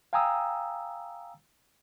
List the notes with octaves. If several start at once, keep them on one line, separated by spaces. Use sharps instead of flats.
F5 G5 G#5 A#5 D#6 E6